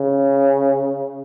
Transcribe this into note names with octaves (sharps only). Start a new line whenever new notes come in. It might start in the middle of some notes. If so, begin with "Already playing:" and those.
Already playing: C#3